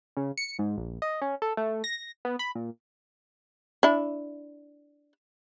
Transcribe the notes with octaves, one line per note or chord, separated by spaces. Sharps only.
C#3
C#7
G#2
A#1
D#5
C#4
A4
A3
A#6
B3
B5
A#2
D4 E4